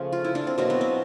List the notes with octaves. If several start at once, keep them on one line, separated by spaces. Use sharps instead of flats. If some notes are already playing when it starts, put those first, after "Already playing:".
Already playing: C#3 F3 A3
F4
E4
D4
C4
B2 F#3 A#3 C4
B3
C4